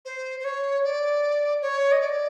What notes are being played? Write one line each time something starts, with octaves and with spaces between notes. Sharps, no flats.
C5
C5
C#5
D5
C#5
D#5
D5